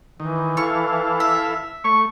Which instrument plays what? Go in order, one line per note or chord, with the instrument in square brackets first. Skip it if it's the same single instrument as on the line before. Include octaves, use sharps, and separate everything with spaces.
[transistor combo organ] D#3 [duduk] E3
[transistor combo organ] E4 A4 F5 [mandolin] C#6
[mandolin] E5
[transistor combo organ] A3 [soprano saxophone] C#6